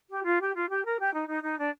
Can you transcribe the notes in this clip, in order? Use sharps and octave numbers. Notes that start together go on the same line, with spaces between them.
G4
F4
G4
F4
G4
A#4
G4
D#4
D#4
D#4
D4